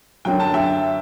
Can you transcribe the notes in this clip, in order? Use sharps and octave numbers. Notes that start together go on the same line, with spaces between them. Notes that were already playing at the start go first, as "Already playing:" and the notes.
F#2 D3 F#3 G5
A5
E5 G5